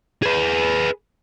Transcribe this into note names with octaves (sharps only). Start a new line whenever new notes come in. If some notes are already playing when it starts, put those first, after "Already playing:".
G#4 B4